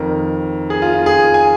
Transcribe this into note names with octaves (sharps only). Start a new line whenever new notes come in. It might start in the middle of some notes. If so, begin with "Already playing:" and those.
Already playing: F2 D#3 A#4
G#4
F4
F4
G#4
G#5